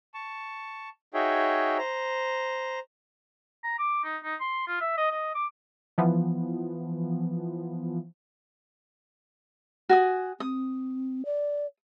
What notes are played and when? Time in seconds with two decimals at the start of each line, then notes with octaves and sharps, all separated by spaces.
0.14 A5 C#6
1.14 D#4 F#4 G#4 C#5 E5 G5
1.78 C5 A#5
3.64 A#5
3.78 D6
4.04 D#4
4.24 D#4
4.40 C6
4.67 F4
4.81 E5
4.98 D#5
5.12 D#5
5.35 D6
5.98 E3 F3 B3
9.89 F#4 G#5 D#6
10.40 C4 D#6
11.25 D5